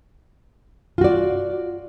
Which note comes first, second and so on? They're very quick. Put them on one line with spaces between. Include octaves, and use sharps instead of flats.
F4 F#4 D5